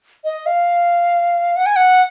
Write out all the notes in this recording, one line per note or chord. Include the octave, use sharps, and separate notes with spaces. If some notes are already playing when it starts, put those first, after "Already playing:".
D#5
F5
F#5
G#5
F#5